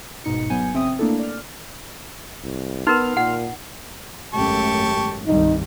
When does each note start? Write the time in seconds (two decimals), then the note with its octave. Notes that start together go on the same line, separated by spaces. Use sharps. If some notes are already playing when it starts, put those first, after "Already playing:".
0.24 G1 G#2 B2 D#4 C#7
0.50 G1 F#3 B3 G#5 G6 C#7
0.74 A1 C#3 C4 E5 G5 D#6
0.99 A3 A#3 D4 E4 A4
1.19 D5 F6
2.44 C2
2.87 B3 D#4 A#4 C6 F6
3.17 A#2 F#5
4.34 G#1 F#2 A3 G4 A5 C#6
5.27 C2 G2 D#3 D#4